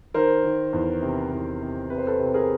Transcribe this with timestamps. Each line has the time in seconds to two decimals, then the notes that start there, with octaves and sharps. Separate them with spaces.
0.14 D#3 A#4 C5
0.44 D#3
0.73 E2
1.02 C3
1.31 E2
1.62 C3
1.90 C3 B4
1.98 C5
2.07 A4 B4
2.19 C3
2.34 G#4 A#4